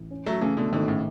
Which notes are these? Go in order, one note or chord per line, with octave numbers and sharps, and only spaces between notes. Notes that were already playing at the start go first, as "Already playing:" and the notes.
Already playing: A1
C#4
F#3 A3
C#3 E3 A3
B2 D3
G#1 B2 D3
A2 C#3